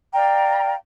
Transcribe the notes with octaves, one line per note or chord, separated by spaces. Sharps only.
D5 F5 G5 A#5